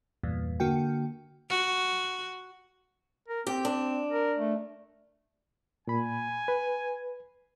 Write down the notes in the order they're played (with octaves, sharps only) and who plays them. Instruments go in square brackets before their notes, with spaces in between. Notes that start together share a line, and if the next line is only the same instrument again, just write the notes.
[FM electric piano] E2 G2 A#2
D3 A#3 F#4 G5
[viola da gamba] F#4
[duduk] A#4
[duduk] C4 [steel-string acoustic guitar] G4
[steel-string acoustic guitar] D4
[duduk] A#4
A3
[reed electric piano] A#2 B5 [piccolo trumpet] G#5
[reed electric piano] B4